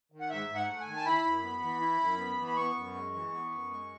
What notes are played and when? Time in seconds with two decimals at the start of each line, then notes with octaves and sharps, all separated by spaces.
0.12 D#3
0.20 F#5
0.30 G#2 E5
0.49 G#2
0.55 F#5
0.68 A3
0.81 G#5
0.87 D#3
0.96 A5
1.05 E4 B5
1.25 F#2
1.43 B3
1.63 E3
1.81 E4
2.00 F#2
2.18 B3
2.37 E3
2.48 B5
2.57 B3 C#6
2.76 F#2
2.95 G#3
3.14 E3
3.33 B3
3.51 F#2
3.70 G#3